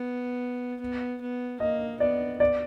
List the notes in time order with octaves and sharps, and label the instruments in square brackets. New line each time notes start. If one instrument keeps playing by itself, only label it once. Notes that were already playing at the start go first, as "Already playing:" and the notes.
Already playing: [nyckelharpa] B3
B3
B3
[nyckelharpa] A#3 [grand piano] D#5
[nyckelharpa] B3 [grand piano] D5
[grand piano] D5